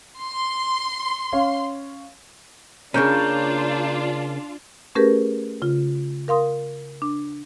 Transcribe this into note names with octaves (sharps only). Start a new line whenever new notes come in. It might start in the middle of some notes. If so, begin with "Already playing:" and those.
C6
C#4 F5
C#3 A#3 C#4 D4 F4 A#5 G6
A3 C#4 G4 G#4 A#4 B4
C#3 F4
A#4 F5 C6 D#6
D4